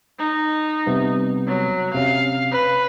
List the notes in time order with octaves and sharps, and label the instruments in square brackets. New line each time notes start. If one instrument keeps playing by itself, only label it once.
[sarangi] D#4
[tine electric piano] C3 G3 B3
[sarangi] F#3
[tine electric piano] C3 C#4 [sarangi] F5
[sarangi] B4